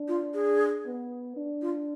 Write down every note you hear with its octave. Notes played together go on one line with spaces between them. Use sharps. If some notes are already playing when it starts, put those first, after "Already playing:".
Already playing: D4
F4
G#4
B3
D4
F4